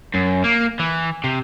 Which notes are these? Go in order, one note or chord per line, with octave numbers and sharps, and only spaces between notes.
F#2
A#3
E3
C3